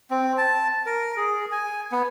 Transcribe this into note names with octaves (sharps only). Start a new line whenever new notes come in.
C4
A5
A#4
G#4
G#5
B3